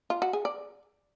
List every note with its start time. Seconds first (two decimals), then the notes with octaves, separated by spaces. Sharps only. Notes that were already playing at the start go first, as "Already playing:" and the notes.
0.10 F4
0.22 F#4
0.33 G#4
0.45 D5